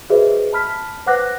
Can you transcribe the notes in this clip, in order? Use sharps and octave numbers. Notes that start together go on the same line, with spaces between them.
F#4 G#4 B4 C5 D#5 E5
A5 B5 F6 B6
B4 C5 F#5 D6 F#6 A#6